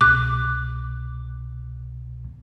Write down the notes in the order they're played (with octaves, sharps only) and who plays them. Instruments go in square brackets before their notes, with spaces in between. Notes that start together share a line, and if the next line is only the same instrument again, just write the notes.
[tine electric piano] C2 B2 [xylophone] D6 F#6